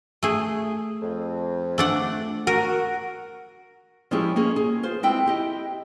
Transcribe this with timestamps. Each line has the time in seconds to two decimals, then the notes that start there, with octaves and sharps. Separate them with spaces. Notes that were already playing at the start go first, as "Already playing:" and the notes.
0.23 A3 G#4
1.02 F2
1.78 A3 D4 F#5
2.47 F#4 A#4
4.11 F3 G#3 C#4 E4 G4 G#4
4.36 A#3 C#4 G#4
4.56 G#4
4.83 F4 C5
5.03 G#3 C4 E4 G5
5.26 E4 G4 D#5